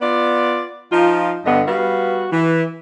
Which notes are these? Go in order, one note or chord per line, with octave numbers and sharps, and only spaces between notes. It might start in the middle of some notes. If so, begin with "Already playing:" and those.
B3 F4 D5
F3 D#4 F4
G2 D3 B3 D#5
G3 B3 F#4 F5
E3